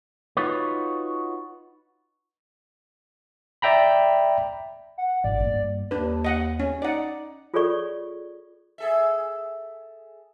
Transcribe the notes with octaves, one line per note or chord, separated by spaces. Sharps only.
D#4 F4 F#4 B4 C#5
D5 E5 G5 A#5 B5
F#5
A1 G#2 D5
G2 A#3
D#2 D4 B4
D#5 F#5
C#4
D#4 D5 F#5
F4 G#4 A4 C#5 D5 C#6
G#4 A4 E5